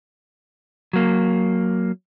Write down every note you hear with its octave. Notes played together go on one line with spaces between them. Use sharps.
F#3 A#3